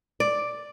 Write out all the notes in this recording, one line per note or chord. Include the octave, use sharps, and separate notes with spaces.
D5